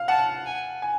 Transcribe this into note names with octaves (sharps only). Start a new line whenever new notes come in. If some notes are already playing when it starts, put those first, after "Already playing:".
Already playing: F5
F#5 A5
G#5
G#5